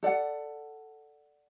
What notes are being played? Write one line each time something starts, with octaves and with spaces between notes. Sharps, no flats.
A4 D5 F#5